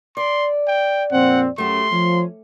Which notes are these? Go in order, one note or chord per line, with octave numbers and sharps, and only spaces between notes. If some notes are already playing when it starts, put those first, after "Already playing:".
D5 C6
G5
F2 A#2 C4 F#5
F#2 F#3 A3 G4 C6
F3 C#4